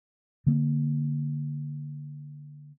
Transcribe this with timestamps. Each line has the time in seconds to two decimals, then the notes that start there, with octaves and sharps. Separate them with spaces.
0.47 D3 A#3 C4